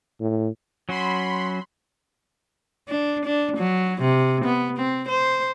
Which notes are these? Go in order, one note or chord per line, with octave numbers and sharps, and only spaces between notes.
A2
F#3 C#4 F#4 B5 C6
D4
D4
F#3
C3
B3
C4
C5